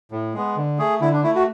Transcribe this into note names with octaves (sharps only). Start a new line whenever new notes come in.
A2
G#3 B3
D3
A3 G#4
D3 E4
D4
A3 E4
F#4